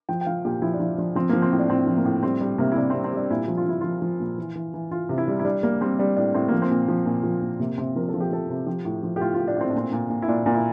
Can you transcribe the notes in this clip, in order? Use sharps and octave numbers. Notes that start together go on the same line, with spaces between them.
F3 G5
G5
F3 F5
A#2 G4
F3 E4
D4
F3 E4
F3 D4
F3 C4
F3 A#3
C4
A2
D4
A2 C4
F3
A#3
A2
G3 C4
G3 D4
C3 A#3
E4
C3 D4
G3 C4
C4
G3 D4
A#2 E4
F3
F4
F3 E4
F3 F4
F3
A#2
E3
E3
E3
E3 F4
C3
E4
G3
E4
G3 D4
G3 A#3
G3 C4
G3 D4
A2 D4
A2 C4
F3 A#3
C4
A#2
F3
A#2
F3
A#2
C3 A#3
C3 C4
F3 A#4
A4
F3
G4
F3 A4
C3
F3 G4
A2
F3
G4
A2 F4
A2 F4
D4
A2 C4
D4
A#2 C4
A#2
A#2
E4
A#2 D4
A#2
E4